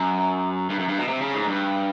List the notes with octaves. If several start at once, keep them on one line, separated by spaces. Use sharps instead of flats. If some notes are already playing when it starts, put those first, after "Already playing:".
Already playing: F#2
G2
F#2
G2
B2
C3
C#3
G#2
G2